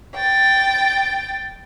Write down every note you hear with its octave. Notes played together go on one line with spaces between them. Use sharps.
G5 A6